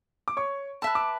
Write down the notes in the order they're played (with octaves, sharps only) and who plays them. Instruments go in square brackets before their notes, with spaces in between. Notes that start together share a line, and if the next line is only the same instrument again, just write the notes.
[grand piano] D6
C#5 C#6
[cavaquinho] B4 E5 A5 [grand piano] E6
[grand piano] D6